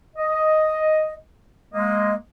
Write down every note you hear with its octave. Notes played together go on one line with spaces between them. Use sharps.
D#5
G#3 A#3 D#5